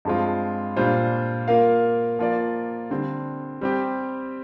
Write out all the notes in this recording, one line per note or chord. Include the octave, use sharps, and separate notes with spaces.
G2 F3 G#3 C4 F4
A#2 G3 D4 F4 C5
A#3 F4 A#4 F5
F3 A#3 F4 A#4 D5
D3 G3 C4
G3 C4 G4